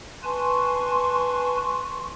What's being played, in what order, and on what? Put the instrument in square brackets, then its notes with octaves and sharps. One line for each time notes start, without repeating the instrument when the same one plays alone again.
[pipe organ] B4 G#5 A5 [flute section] C6 C#6